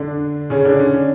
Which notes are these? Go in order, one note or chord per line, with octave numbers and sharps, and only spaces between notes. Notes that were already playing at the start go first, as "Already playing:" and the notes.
Already playing: D3 D4
C#3 C#4
D3 D4
C#4
D4